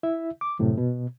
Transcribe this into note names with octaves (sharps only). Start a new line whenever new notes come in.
E4 E5
D6
F#2 A2 C3
B2